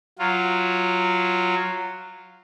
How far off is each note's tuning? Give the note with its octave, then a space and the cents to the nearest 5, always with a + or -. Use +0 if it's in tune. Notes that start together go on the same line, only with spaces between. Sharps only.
F#3 +0 F4 +0